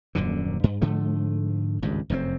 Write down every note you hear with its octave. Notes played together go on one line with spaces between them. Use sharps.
D#1 F#2 A#2 D3
G2
G#2 D3 F3 A3
G#1 C#2 G2
F1 F#2 C#3 C4